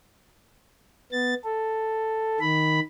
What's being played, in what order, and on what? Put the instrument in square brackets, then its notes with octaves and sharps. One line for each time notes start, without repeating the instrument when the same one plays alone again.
[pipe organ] B3 A6
A4
D#3 B5